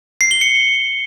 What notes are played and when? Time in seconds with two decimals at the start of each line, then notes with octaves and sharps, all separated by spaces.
0.21 C7
0.31 G7
0.41 C#7